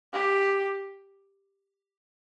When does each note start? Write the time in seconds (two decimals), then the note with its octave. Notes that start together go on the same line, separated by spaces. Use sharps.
0.13 G4